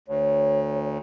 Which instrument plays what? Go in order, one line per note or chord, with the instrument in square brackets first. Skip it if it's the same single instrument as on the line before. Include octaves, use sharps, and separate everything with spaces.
[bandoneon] D2 [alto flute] C#5